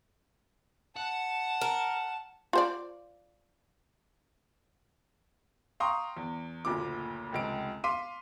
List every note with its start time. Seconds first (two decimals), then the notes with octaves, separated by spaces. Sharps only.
0.97 F#5 A5
1.61 A#4
2.53 F4 C5 D5
5.80 F5 G5 A#5 C6 C#6 D#6
6.17 E2
6.65 F#1 D2 A#2 D6
7.33 F1 C#2 D7
7.84 F5 C6 D6 B6 D#7